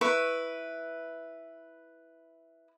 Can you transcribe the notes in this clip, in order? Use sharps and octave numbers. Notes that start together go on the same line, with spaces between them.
E4 B4 C#6